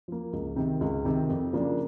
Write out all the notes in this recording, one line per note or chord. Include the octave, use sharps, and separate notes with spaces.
F3 A#3
C#2
C3 D#3
C#2
C3 D#3
F2
C#3 F3 A#3 D4